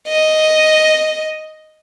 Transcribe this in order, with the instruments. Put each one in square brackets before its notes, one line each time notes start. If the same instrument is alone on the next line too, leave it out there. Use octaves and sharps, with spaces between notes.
[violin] D#5